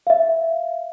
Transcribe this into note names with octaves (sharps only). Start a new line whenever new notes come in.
E5 F5